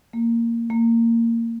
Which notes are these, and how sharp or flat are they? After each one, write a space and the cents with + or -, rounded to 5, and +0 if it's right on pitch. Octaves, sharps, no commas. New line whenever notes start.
A#3 -10
A#3 -20